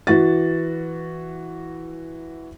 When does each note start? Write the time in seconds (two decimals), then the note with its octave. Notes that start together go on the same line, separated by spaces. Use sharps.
0.07 E3 F#4 A6